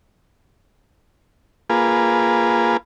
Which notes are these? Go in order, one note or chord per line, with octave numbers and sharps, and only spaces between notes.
A#3 F4 G#4 B4